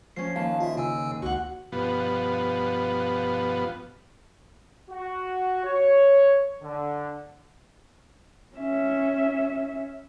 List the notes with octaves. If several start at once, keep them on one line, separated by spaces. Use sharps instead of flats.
F3 C#4 C7
D#2 F5 A5
F4 E5
C#3 G#5 E6
C#2 F#4 F#5
G2 B2 F3 B3
F#4
C#5
D3
C#4 E5